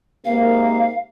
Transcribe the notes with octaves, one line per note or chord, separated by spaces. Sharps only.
G#2 C3 A#3 F5